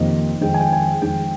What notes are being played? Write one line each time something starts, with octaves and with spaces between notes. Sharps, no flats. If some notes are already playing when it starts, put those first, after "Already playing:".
Already playing: F2 C3 D#3 A#3 D#5
F2 D#3 G#3 G5
G#5
G5
G#5
G5
F2 D#3 G#3 G5